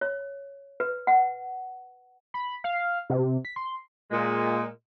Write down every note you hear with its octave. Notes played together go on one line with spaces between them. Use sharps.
C#5
B4
F#5
B5
F5
C3
B6
C6
A#2 G#3